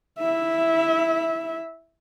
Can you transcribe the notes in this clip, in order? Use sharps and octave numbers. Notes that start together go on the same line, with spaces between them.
E4 E5